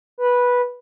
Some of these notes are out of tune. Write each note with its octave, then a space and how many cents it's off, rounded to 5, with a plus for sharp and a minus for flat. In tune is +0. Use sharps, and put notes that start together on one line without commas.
B4 -10